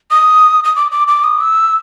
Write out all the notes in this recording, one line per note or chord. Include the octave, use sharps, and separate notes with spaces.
D#6
D#6
D6
D6
D6
D#6
E6